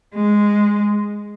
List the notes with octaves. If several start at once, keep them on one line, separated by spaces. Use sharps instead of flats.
G#3